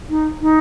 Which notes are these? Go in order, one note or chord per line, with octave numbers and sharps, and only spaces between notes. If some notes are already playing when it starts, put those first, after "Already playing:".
D#4
D#4